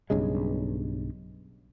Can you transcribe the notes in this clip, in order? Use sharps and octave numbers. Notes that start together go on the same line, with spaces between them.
B1 G2 C#3 G#3